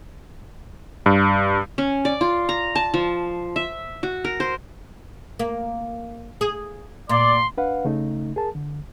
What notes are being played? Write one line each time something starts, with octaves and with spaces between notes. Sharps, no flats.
G2
C#4
D5
F4
A#5
A5
F3
E5
F#4
A#4
C5
A#3
G#4
A#2 D5 C6
D4 B4 F5 F#5
C#3 A3 D#4
G#4 A#4 A5
D3